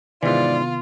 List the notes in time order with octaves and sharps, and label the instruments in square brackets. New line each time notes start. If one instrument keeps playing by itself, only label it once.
[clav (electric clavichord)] G#2 E3 [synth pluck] C3 D#3 B3 [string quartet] F4 [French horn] D5